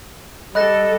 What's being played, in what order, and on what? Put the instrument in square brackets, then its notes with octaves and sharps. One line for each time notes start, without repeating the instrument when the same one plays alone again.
[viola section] G3 A4 [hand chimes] D#5 [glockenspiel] B5 F#6 A#6